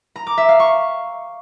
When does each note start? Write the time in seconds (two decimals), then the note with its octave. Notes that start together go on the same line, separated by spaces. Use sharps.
0.16 A#5
0.27 D6
0.38 E5
0.49 F5
0.60 C#6